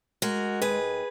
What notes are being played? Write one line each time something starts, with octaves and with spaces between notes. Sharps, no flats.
G#3 F#4 A#4
D#2 G#4 B4